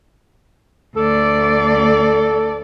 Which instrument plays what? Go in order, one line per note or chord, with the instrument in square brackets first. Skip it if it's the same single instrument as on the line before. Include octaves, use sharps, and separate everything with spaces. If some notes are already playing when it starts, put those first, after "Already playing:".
[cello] D2 D5 [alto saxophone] A4